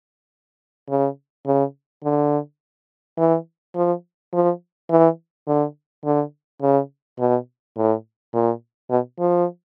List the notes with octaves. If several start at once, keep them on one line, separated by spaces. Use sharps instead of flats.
C#3
C#3
D3
E3
F3
F3
E3
D3
D3
C#3
B2
A2
A#2
B2
F3